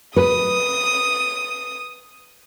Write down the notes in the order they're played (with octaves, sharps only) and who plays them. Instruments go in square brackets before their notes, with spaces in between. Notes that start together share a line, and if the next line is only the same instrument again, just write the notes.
[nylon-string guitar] B4 [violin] D#6